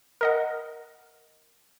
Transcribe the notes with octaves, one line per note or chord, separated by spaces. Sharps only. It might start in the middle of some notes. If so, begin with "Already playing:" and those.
A#4 D#5 F#5